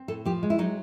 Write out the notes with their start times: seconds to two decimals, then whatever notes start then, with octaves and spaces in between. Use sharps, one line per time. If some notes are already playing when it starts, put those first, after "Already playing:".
Already playing: C4
0.08 A2 A4
0.25 F3 G4
0.43 G#3
0.50 E4
0.58 F#3 D#4